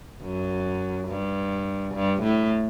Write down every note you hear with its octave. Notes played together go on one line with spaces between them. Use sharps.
F#2
G2
G2
A2